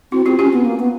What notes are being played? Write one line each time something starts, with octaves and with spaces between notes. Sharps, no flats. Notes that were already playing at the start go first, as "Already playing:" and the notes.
C4 E4 F#4
C4 F4 G4
C#4 F4 G4
B3
A#3
B3